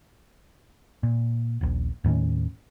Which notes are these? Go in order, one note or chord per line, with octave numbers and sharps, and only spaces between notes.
A#2
D#1 A#1
D#2 A2 D#3 C#4